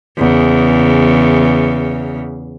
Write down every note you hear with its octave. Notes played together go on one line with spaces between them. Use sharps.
E2 C#3